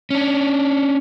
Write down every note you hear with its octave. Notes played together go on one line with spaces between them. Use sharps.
C#4 D4